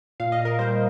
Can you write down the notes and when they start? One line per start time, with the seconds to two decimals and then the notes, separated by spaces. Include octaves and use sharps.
0.20 A#2 F5
0.32 D#5
0.39 A#2
0.45 A#4
0.59 G3 C5